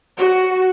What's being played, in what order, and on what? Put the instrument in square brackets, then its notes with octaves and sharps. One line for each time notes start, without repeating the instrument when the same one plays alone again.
[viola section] F#4